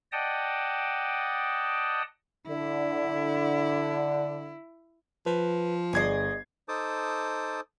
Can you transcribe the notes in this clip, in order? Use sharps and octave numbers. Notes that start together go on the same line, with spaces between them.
D5 D#5 F#5 G5 A5 D#6
D3 E4
F3 B4
G1 G#4 D5 D#5 G#6 C7
D#4 A4 C5 A5 D6 D#6